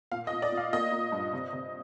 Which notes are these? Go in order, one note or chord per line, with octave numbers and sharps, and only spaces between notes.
A#2 F5
D#5
A#2
D5
A#2
F5
A#3 D#5
A#3
G2
C3
C3